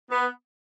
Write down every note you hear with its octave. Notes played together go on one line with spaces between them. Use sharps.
B3